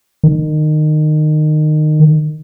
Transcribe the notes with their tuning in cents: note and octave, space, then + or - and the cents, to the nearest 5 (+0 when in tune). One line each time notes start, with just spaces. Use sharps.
D#3 -25